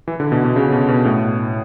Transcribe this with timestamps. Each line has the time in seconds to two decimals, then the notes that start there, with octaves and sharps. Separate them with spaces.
0.08 E3
0.20 D3
0.32 B2
0.44 B2
0.56 C#3
0.72 B2
0.88 B2
1.05 A2